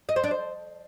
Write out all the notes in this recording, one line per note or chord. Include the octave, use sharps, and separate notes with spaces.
D#5
C5
D4
C5